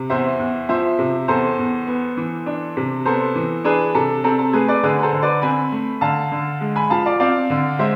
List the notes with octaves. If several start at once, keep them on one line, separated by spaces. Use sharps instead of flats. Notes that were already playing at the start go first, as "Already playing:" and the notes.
Already playing: C3
E2 C5 E5
E2
F3 C5 E5
C3
E2 A4 C5
E2
B3
E3
D4
C3
B3 A4 C5
E3
D4 G#4 B4
C3 A4
C4 A4
A4
A3 G#4 B4
B4 D5
D3 G#4 B4
B4
A4 C5
D3
B4 D5
C4 G#5 B5
A3
D3 F5 A5
D3
G#3
G#5 B5
F3 F5 A5
D5 F5
C4 D5 F5
D3
G#3 C5 E5